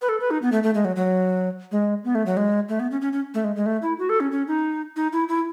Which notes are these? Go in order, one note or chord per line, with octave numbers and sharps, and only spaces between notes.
B4
A4
B4
D#4
B3
A3
A3
G#3
F#3
F#3
G#3
B3
A3
F#3
G#3
A3
B3
C#4
C#4
C#4
A3
G#3
G#3
A3
E4
F#4
A4
C#4
C#4
D#4
D#4
E4
E4